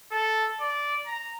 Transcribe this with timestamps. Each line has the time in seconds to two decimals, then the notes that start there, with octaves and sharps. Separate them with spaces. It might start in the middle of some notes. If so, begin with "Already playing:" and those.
0.11 A4
0.60 D5
1.06 A#5